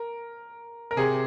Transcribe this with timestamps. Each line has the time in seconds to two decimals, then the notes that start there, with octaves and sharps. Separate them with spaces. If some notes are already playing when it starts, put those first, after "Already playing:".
Already playing: A#4
0.91 A#4
0.97 C3 G#4